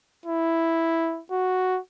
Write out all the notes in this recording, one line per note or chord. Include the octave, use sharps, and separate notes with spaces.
E4
F#4